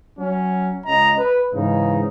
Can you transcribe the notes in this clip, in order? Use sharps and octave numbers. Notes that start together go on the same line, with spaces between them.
F#3 C#4
C#2 C#3 D#5 A#5
B4
G#2 C#3 E3 D#4